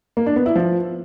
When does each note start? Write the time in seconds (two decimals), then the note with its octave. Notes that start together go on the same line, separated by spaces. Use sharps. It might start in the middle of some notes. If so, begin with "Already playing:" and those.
0.17 A#3
0.26 D4
0.36 B3
0.46 E4
0.56 F3